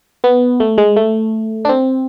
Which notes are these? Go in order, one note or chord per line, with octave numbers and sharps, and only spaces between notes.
B3
A3
G#3
A3
D4
C4